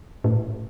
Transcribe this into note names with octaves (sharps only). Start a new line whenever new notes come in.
A2